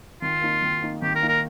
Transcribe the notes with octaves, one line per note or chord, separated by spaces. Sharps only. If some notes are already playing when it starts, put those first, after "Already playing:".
D#3 F4
A#3 D#4
D#3
A#3 D#4
D#3 G4
A#4
A#3 D#4
A#4